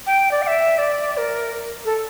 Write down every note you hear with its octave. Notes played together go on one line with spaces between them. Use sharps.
G5
D5
G5
E5
D5
D5
A#4
A4